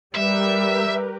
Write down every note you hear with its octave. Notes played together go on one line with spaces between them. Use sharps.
G3 G4 A#4 B4 E5